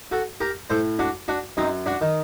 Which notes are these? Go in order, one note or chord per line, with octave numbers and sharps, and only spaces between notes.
F#4 A4
G4 A#4
A2 A4 C5
D4 F#4
D4 F#4
F#2 C4 D#4
D4 F#4
D#3